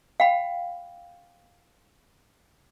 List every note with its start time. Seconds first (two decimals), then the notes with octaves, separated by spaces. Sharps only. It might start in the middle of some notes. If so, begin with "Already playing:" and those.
0.20 F5 G5 B5